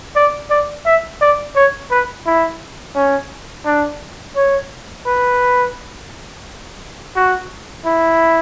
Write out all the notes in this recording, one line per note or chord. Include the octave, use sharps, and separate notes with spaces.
D5
D5
E5
D5
C#5
B4
E4
C#4
D4
C#5
B4
F#4
E4